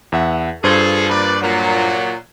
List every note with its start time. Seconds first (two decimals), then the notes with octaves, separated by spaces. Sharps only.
0.12 E2 E5 F#5
0.64 G2 F4 G#4 A4 C5 G#6
1.09 A#2 B4 D5
1.42 A#2 F#3